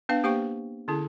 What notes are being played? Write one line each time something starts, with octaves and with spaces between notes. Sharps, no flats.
B3 D4 B4 F5
A#3 G4 C5 F5 G5 C#6
D3 C#4 E4 G#4